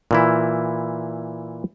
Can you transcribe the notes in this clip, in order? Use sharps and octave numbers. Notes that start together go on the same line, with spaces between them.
A#2 E3 E4